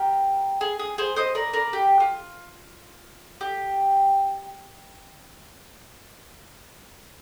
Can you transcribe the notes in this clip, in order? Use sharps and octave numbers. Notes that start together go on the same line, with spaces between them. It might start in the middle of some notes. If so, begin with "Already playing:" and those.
Already playing: G4 A#4
G#4
G#4
G#4 C5
C5 D#5
A#4 D5
A#4 D5
G4
F4
G4